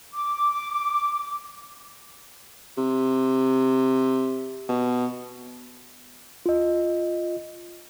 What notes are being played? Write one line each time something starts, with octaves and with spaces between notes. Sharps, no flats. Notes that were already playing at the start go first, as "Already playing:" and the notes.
D6
C3
B2
F4 D#5